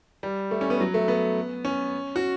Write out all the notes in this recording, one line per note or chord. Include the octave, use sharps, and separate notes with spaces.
G3
A3
C#4
B3
F#3
A3
B3
C#4
F#4